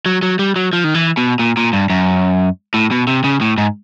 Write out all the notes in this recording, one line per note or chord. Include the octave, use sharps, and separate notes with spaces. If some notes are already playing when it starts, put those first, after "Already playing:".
F#3
F#3
G3
F#3
F3
D#3
E3
B2
A#2
A#2
G2
F#2
A2
B2
C3
C#3
A2
G#2